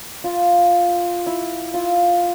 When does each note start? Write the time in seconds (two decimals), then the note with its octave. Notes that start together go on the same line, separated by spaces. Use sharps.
0.24 F4
1.26 E4
1.74 F4